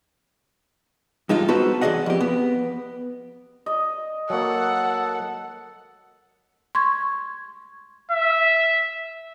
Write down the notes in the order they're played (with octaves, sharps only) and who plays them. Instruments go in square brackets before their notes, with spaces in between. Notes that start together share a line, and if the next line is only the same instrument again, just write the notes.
[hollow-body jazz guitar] G2 G#3 D#4 F4
B3 D#4 F#4 A4 B4 C5
E2 G#4 A4 D5 D#5 F#5
F2 G4
B3
[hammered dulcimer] D#5
[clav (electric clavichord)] F#3 A#3 [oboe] A4 [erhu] F#5
[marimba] C6 C#6 G#6
[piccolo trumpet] E5